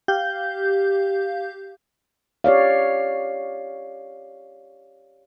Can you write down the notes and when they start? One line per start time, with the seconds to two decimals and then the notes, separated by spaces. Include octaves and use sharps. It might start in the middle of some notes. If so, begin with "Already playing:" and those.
0.08 G4 F5 G6
2.44 G4 C#5 D5 F5